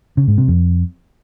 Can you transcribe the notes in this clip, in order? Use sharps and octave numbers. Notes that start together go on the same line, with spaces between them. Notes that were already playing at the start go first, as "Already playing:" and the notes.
C#3
G#2
C3
F2